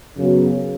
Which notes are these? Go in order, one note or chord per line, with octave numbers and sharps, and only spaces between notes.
F#2 C#3 F#3 B3